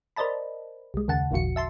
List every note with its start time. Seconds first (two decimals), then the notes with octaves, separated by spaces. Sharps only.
0.16 A#4 C5 D5 D#5 A5 B5
0.94 C2 G#3
1.08 D#2 C#3 F#5 A5
1.31 G#1 D#2 A#2 F3 F#4 C#7
1.56 E5 A5 C6